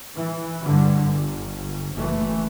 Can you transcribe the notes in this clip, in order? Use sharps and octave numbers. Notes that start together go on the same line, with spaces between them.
E3
G2 D3
G1
F#1 E3 A3